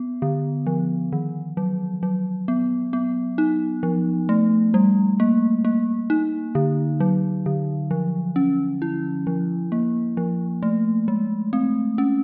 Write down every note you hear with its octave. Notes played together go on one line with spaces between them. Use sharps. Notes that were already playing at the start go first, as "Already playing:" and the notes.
Already playing: B3
D3
F3
D#3
F#3
F#3
B3
B3
D#4
F3
A3
G3
A#3
A#3
D#4
D3
F#3
D3
F3
C#4
E4
F3
A#3
F3
A3
G#3
C4
C#4